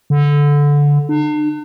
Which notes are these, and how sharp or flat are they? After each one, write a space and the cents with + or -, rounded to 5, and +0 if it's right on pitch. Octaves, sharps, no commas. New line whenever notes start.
D3 -15
D4 +45